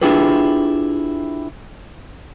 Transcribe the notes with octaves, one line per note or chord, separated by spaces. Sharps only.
D4 E4 F4 G4 G#4 B4